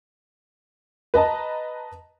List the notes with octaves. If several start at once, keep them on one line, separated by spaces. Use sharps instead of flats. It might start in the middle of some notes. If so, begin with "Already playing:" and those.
B4 D#5 A5 A#5